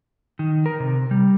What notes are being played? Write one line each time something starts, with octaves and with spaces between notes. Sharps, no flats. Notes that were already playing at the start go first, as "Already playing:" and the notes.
D#3
A#4
C3
G3